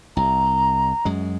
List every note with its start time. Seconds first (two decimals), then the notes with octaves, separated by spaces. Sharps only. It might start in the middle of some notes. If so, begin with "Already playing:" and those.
0.17 C2 A#5
1.05 F#2 G#3